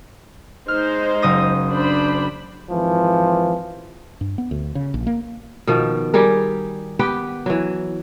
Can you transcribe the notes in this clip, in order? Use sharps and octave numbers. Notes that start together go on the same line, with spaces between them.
G#3 D#4 C5 F6
F#1 D#6 A#6
D4 C5 B5
G#1 E3 F3
G2
B3
D2
C#3
A#1
A#3
B2 D#3 F3
G3 G4 G#4 A#4
B3 G4 B4 G5
E3 F#3